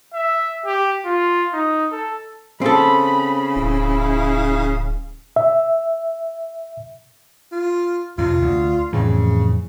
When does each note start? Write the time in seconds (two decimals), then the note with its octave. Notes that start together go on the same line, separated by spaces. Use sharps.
0.14 E5
0.66 G4
1.05 F4
1.53 D#4
1.92 A4
2.61 C#3 C4 A4 B5
3.56 D1 E4
5.36 E5
7.52 F4
8.18 F2 C3 F4
8.41 D2
8.93 F2 A2 C#3 E3